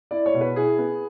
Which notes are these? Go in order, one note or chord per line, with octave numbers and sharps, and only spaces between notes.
E4 D5
C#5
B2
B4
E4 G#4
B3